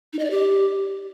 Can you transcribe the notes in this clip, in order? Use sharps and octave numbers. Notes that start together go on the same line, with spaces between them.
D#4
D#5
D5
G4